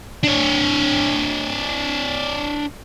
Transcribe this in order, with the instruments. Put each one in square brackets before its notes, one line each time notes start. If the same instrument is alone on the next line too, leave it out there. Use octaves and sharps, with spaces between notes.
[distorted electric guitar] D4 C#5